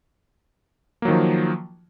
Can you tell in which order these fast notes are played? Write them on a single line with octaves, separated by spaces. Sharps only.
A#3 F#3 D#3 F3